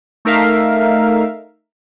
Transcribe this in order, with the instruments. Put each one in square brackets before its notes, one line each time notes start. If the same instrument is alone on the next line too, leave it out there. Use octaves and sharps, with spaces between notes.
[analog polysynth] A3 D#4 A#4 E5 F5